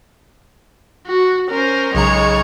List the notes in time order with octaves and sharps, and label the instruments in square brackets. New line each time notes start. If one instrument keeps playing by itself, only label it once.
[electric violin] F#4
[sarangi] C#4 [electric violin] A#4 C5
[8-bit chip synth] B1 C#3 A#5 [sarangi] G#3 [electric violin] C#5